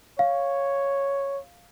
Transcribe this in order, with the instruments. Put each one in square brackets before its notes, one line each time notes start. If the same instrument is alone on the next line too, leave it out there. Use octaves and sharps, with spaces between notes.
[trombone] C#5 [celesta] F5